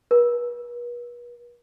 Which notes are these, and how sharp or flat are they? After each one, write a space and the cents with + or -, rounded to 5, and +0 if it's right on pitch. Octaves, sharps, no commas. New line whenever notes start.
B4 -40